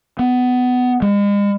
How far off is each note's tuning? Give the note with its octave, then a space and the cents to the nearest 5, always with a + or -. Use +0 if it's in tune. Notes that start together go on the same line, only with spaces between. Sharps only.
B3 +20
G#3 -40